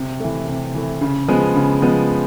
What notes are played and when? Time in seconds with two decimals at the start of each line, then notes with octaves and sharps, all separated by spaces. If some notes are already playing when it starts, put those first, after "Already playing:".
Already playing: C3
0.20 E3 A3
0.48 C3
0.75 E3 A3
1.01 C#3
1.28 F3 G#3 B3
1.55 C#3
1.82 F3 G#3 B3